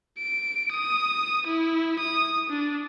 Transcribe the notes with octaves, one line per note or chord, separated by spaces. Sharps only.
D7
D#6
E4
D#6
D4